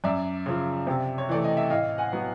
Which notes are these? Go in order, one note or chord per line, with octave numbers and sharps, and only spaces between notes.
F#2 D5 E5
C#3 F3
C3
C#5
E3 A3 D5
D#5
E5
A2 D#5 F5
F#5 G#5
F#3 B3